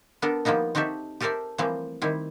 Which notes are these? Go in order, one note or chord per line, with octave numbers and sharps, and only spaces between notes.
B3 D4 A4 A#4
F3 G3 A#3 B3 D#4
C4 D#4 F#4 G4 A4 E5
G4 A4 A#4 C5 D5 E5
E3 F3 G3 A3 A#3 C4
D#3 G3 C4 E4